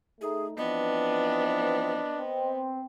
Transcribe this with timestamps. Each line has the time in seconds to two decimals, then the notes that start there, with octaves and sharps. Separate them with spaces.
0.21 A3 D#4 G#4
0.58 E3 F3 B3 C4 D4 D#5
2.17 C4